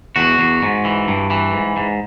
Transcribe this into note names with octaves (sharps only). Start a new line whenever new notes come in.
E2 F#4
E2
G#2
E3
G2
E3
G#2
G#2